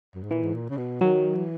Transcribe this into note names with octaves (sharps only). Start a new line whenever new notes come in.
F#2
G#2
A#2 E3
G#2
A#2
C#3
B2
D#3 F#3
E3